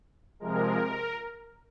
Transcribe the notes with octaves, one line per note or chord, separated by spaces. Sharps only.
C3 F3 G#3 A#4